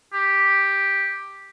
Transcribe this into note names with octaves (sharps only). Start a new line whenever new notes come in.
G4